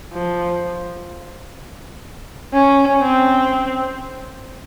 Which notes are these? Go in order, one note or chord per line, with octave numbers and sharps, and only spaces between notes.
F3
C#4
C4